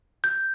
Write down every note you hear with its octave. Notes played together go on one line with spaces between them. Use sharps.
G6